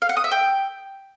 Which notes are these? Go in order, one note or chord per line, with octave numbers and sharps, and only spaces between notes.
F5
F#5
D#6
E5
G5